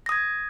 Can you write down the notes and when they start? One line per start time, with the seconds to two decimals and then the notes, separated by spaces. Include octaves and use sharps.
0.06 A#6
0.09 D#6
0.12 G#6